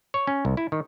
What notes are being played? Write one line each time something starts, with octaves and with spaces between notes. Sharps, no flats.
C#5
C#4
C2
E4
D#3